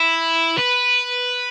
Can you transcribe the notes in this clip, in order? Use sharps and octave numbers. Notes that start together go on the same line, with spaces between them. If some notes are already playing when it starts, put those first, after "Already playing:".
Already playing: E4
B4